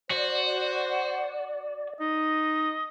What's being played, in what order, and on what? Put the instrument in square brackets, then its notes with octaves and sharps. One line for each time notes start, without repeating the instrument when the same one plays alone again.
[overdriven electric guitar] F#4 [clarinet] C5 [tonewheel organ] D5
[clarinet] D#4 [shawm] D#5